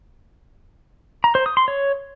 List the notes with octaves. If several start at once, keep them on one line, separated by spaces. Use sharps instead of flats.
A#5
C5
D#6
C6
C#5